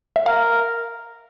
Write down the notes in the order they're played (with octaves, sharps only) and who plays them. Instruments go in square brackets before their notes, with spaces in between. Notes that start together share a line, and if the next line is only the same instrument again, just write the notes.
[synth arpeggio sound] E5
[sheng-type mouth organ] A#4 [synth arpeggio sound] F5